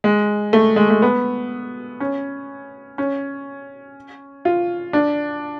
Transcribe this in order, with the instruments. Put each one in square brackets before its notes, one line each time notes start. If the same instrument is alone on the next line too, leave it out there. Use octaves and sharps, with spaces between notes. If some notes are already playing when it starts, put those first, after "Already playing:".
[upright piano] G#3
A3
G#3
A3
B3
C#4
C#4
F4
D4